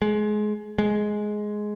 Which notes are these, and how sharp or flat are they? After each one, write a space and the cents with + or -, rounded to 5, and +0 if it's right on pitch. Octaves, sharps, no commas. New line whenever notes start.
G#3 +25
G#3 +10